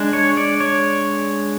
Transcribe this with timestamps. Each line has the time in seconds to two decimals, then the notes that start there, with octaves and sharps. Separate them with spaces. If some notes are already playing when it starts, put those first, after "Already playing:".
Already playing: G#3 D4
0.13 C#5
0.37 D5
0.60 C#5